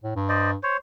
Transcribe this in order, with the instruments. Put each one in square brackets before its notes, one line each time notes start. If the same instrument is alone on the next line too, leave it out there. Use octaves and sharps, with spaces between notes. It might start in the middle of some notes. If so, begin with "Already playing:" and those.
[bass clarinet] A2
G2
[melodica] C5 D5 D#5
C5 C#5